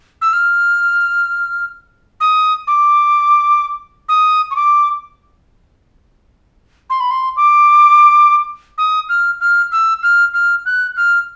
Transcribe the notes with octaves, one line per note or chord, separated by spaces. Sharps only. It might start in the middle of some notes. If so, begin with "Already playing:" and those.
E6
F6
D#6
D6
D#6
C#6
D6
C6
B5
C6
D6
D#6
F6
F6
E6
F6
F6
F#6
F6